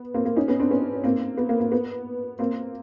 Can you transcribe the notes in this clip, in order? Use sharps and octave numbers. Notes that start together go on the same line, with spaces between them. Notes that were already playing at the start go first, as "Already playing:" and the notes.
Already playing: B3
A#3 C4
A#3
C#4 D#4
B3 C#4
C4 D4
B3 C#4
A#3 C4
B3
A#3
A#3
B3
A#3 C4